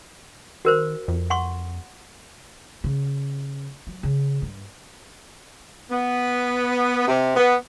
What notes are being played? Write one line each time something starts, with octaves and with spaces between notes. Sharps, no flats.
D#3 F#4 A#4 C5
F2
F#5 C6 C#6
C#3
F#3
C#3
G2
B3
C3
B3